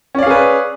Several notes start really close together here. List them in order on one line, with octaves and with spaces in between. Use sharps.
C#4 D5 F5 G#4 B4